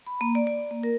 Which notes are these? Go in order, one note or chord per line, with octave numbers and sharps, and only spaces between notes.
B5
A#3
D5
D5
A#3
A#4